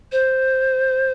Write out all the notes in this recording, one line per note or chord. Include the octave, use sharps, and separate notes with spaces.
C5